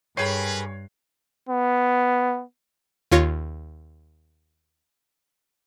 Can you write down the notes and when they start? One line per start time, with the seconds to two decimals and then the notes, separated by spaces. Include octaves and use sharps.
0.17 G2 G4 G#4 A#4 B4 C#5 B5 C7
1.49 B3
3.11 D#2 F4 C#5 A#6